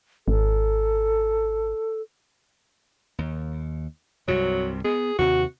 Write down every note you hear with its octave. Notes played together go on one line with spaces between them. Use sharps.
G#1 A4
D#2
C2 G2 C3 F#3
B3 G#4
D#2 C3 F#4